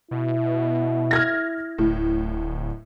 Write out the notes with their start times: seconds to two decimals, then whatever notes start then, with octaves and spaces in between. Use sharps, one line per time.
0.11 B2 E4
1.11 F6 G#6 A#6
1.78 D1 A2